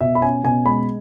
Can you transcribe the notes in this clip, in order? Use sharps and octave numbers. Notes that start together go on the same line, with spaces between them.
B2 E5
B5
C#4 G#5
B2 G#5
G#3 B5